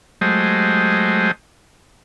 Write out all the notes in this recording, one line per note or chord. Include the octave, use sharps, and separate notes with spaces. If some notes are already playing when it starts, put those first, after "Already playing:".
F#3 G#3 A3 G4 C5 D#5